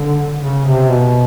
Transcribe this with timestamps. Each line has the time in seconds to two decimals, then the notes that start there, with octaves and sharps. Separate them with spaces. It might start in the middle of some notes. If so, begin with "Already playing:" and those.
Already playing: D3
0.40 C#3
0.66 C3
0.89 B2